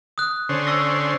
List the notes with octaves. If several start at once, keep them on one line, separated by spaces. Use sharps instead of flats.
D#6 F#6
D3 C#4 C5
C#6 E6 A#6